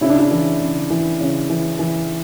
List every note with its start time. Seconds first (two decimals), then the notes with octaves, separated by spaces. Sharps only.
0.01 C#3 E4
0.10 D4
0.18 E4
0.31 E3
0.62 C#3
0.90 E3
1.21 C#3
1.50 E3
1.79 E3